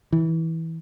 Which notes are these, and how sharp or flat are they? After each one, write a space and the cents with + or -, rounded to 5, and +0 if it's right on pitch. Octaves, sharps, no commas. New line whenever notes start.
E3 -20